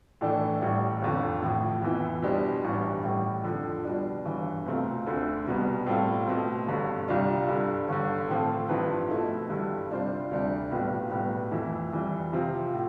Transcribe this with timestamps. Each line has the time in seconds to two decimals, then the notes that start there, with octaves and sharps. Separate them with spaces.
0.21 A2 E3 A3 D4 A4
0.61 A1 A2 G3
1.02 G1 F2 D3
1.42 A1 A2 F3
1.82 F2 E3 B3 E4
2.22 B2 G3 D4 G4 C5
2.64 A1 G2 E3 G3
3.03 A1 A2 G3
3.44 F2 D3 F3
3.84 B2 G3 D4
4.25 G1 G2 E3
4.66 C2 B2 A3 C4 F4
5.06 D2 D3 A3 C4
5.46 C2 B2 G3 B3
5.86 A2 G3 C4 F4 A4
6.27 B2 A3 C4
6.67 G1 G2 D3
7.08 C2 C3 G3 D4 F4
7.47 G2 D3 G3
7.88 G1 G2 D3
8.28 A2 F3 C4 F4 A4
8.69 G2 F3 C4 E4 B4
9.10 B2 A3 E4 A4
9.49 G2 D3 G3
9.90 C3 G3 D4 F4 C5
10.31 D2 C3 G3 D4
10.71 B1 A2 G3 B3 F4
11.11 B1 A2 G3 B3
11.51 F2 E3 A3 E4
11.92 F2 E3 G3
12.33 C3 F3 C4 F4
12.73 A2